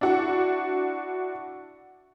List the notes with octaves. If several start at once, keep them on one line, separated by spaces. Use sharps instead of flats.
D4 E4 F#4